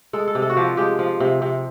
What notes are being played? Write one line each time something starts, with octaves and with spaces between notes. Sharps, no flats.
G#3 A4
A4
C3
A4
F#4
F3 G4
G#3 G4
F3
C3
C3